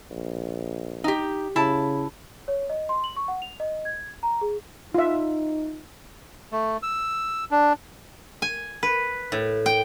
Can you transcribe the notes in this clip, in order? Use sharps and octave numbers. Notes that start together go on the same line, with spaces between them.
A#1
D#4 G4
C#3 E4 A5
C#5
D#5
C6
F#7
C#6
F#5
F7
D#5
G#6
A#5
G#4
D#4 F4 E5
A3
E6
D4
G#5
B4
A2
G5